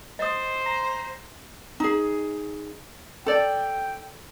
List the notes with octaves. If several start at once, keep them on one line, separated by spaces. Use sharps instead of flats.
C5 D#5 D#6
A#5
D#4 G#4
A4 D5 G5